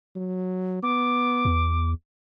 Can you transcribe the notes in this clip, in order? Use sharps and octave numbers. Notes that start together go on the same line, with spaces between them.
F#3
B3 D6
E2